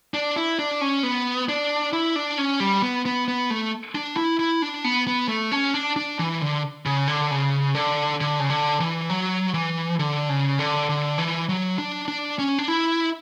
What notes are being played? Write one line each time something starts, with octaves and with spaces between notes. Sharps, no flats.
D4
E4
D4
C#4
B3
D4
E4
D4
C#4
G3
B3
B3
B3
A3
D4
E4
E4
D4
B3
B3
A3
C#4
D4
D4
E3
D3
C#3
D3
C#3
D3
D3
C#3
D3
E3
F#3
E3
D3
C#3
D3
D3
E3
F#3
D4
D4
C#4
D4
E4